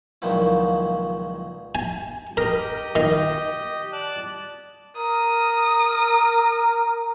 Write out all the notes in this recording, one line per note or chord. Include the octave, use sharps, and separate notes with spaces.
C#2 A#2 D#3 F3 F#3 E4
G#5
G4 A#4 D#5
D#3
D5 A5 F#6
A#4 D#6